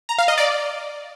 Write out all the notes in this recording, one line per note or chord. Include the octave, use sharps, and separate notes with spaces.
A#5
F5
D#5
D5